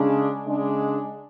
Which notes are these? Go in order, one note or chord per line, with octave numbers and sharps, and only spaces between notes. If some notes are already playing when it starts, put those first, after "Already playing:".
Already playing: C#3 G#3 D4
C#3 G#3 D4